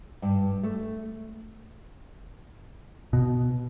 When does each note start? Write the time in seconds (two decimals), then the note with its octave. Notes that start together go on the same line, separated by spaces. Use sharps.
0.22 G2
0.63 A3
3.13 B2